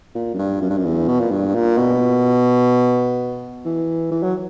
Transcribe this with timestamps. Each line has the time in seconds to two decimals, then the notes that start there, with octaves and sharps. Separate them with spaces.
0.15 A#2
0.34 F#2
0.39 G2
0.62 F#2
0.70 G2
0.78 F#2
0.85 E2
1.08 B2
1.20 A#2
1.31 G2
1.55 A#2
1.78 B2
3.65 E3
4.11 E3
4.23 F#3